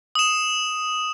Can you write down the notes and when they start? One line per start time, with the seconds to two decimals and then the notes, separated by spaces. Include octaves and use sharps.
0.15 D#6 E7